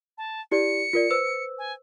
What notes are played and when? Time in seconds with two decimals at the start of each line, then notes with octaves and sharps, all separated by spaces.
0.18 A5
0.51 E4 G4 D5 C#7
0.93 F4 A#4 D5
1.10 B4 C5 E6
1.58 G#5